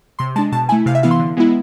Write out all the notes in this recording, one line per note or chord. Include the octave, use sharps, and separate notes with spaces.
C3 C6
G#3 D4 A5
B2 A5
A3 E4 G#5
C3 F5
E5
E3 B3 E4 F5
C6
D3
G#3 B3 E4